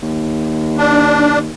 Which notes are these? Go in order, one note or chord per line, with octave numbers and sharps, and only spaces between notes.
D#2
D4